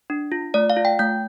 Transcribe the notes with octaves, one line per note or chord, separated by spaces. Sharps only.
D4
F4
A3 D5
F5
F4
G5
A3 G6